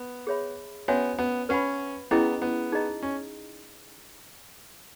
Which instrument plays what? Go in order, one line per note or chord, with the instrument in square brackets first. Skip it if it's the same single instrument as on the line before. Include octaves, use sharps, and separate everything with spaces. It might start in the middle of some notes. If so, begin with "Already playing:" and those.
Already playing: [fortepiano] B3
[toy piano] G#4 C#5 E5 B5
[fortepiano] B3 [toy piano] C#4 F#4 C#5 E5 G#5
[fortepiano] B3
[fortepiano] C#4 [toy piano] B4 F#5 B5
[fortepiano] B3 [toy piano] C#4 E4 G#4 D#5 A#5
[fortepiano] B3
[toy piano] D#4 G#4 D#5 A#5
[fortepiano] C#4